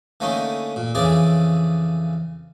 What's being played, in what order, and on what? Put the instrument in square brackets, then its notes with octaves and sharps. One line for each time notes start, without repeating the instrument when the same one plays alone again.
[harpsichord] D3 A3 A#3 C#4 D#4
A#2
F2 C#3 E3 G#4 D5 D6